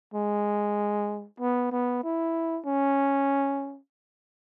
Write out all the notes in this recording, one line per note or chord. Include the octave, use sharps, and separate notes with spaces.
G#3
B3
B3
E4
C#4